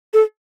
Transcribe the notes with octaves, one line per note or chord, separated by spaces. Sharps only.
A4